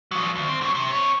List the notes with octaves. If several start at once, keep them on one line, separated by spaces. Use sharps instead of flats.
F3 F#3
D2
C4
D3 F#3
C3
C4 C#5